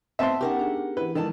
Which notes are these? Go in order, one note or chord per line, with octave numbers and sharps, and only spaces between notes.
A3 B3 C4 E5 A5 C6
B3 C#4 D#4 G4 A#4 F#5
D4 G#4
E3 E4 B4
D#3 F3 G#3 E4 A4 D5 A5